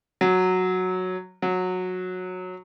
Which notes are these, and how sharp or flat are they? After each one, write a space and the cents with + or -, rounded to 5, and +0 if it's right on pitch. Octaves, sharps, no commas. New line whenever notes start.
F#3 -5
F#3 -15